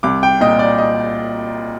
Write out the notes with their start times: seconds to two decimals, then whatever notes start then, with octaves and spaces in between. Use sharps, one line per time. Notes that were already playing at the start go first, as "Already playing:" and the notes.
0.03 C2 D6
0.23 G5
0.41 A#2 D#5
0.59 D5
0.78 D#5